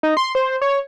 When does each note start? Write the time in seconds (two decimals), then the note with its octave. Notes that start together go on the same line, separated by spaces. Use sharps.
0.03 D#4
0.17 C6
0.35 C5
0.62 C#5